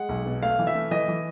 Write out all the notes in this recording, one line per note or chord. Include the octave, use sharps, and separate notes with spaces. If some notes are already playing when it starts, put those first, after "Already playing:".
Already playing: G#3 F#5
B1
B2
A3 F5
E3
E5
A3
E3 D#5
E3